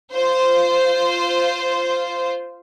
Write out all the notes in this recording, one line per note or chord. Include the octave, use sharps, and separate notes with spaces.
F4 C5